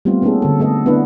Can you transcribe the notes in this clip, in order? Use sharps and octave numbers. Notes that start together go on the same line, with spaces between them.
G3 A3 B3 C4 F4
A#3 B3 C#4 D#4 G#4 A4
D3 A4
A3 B3 A4 D#5
A#3 B3 D4 E4 B4